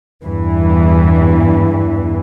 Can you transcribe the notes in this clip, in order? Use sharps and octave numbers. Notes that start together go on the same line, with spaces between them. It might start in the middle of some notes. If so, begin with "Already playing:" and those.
E2 G2 E3